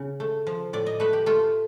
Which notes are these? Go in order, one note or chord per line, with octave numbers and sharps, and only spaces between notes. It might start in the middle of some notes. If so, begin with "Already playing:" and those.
Already playing: C#3
A3
F3
A2 D5
D#5
A3 B4
G4
A3 F4